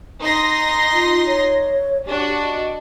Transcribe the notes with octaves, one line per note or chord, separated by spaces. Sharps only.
D#4 C6 A#6
F4
C#5
D4 F#4 G4
D#5